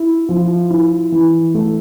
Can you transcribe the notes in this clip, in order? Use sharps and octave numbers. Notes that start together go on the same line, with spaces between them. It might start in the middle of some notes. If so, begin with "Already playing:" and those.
Already playing: E4
F3
E4
E3
A3